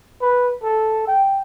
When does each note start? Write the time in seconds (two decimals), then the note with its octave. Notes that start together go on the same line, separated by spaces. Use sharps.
0.21 B4
0.63 A4
1.07 G5